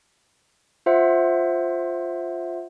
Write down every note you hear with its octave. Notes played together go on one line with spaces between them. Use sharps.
F4 C5 E5 F#5